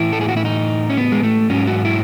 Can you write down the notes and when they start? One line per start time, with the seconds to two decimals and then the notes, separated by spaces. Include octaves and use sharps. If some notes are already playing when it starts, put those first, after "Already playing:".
Already playing: A2 E3 E4
0.13 A4
0.21 G#4
0.28 F#4
0.37 E4
0.45 D#4
0.90 C#4
0.97 B3
1.12 G#3
1.23 A3
1.50 G#2 F#3 C#4
1.67 F#4
1.85 E4